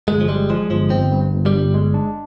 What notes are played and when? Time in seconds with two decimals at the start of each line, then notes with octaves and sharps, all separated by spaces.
0.08 G1 G#3
0.21 F3
0.28 G3 G#3
0.50 F3 G#3
0.70 G1 F3
0.90 G1 C4
1.12 G2
1.32 G1
1.46 G3
1.53 G1
1.74 G#3
1.94 D4